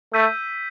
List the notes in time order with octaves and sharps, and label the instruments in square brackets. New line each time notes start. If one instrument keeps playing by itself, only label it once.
[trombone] A3 [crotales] E6 G6 B6 D#7